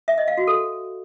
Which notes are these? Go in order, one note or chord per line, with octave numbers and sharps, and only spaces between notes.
E5
D#5
F5
F#4
A4